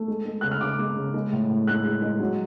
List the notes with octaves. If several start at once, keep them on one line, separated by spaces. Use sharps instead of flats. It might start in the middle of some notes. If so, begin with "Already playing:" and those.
Already playing: A3
G#3
G#3
C#3 F#6
F6
C#3 D6
G#3
C#3
G#3
A2
A2
G#3 F#6
G#3
G#3
F#3